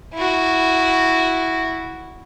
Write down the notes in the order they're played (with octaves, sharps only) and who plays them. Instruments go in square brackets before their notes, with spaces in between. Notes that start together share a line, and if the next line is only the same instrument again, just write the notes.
[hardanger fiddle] E4 F#4